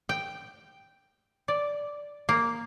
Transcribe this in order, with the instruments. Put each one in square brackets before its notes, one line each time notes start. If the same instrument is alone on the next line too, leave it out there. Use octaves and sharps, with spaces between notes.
[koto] G5
D5
A#3